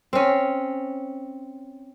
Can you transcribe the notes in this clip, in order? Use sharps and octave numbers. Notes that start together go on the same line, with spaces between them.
C4 C#4